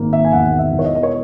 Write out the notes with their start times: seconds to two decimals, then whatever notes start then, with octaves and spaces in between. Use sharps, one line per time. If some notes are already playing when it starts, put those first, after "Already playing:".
Already playing: G#1 A#3
0.13 E5
0.25 G#5
0.32 E1 F#5
0.59 E5
0.72 E2
0.79 C#5
0.84 D#5
0.95 D#5
1.03 C#5